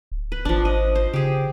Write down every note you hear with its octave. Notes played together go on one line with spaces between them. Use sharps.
D1
B4
G#1 F3 D4
D#5
C5
C#3 G4 G#4